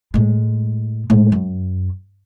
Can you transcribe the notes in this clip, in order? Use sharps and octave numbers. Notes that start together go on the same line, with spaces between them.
A2 G#3
A2 G#3
F#2